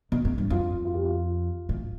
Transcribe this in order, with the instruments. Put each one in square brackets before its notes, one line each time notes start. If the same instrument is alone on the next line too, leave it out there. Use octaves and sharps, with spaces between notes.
[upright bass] B2
A2
G2
[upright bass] F2 [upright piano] F4
[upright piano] F4
G4
F4
[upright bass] A2